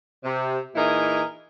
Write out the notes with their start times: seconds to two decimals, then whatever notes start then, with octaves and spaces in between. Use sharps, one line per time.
0.24 C3
0.75 A#2 E3 D#4 E4 G#4 A#4